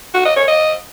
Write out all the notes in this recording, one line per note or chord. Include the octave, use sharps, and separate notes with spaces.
F#4
D#5
C#5
D#5